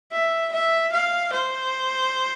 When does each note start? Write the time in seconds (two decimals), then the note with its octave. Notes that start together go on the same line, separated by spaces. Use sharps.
0.12 E5
0.52 E5
0.92 F5
1.32 C5